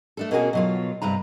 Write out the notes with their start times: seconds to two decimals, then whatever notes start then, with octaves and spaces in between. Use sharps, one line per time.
0.17 A3 D4 A4
0.31 B2 A#3 C#4 F4 F#4 G#4
0.53 B2 F#3 F4
1.02 G2 C3 B4 A#5